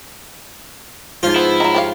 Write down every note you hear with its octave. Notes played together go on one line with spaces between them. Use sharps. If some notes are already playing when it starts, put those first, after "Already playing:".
G#2 F3 F4
B3 E4
D#3 F#3
G4 C#5 F5